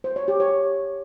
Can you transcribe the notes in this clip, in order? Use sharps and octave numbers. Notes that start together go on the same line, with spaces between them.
C5
C#5
G4
C#5